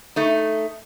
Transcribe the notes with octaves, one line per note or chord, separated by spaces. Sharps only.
A3 D#4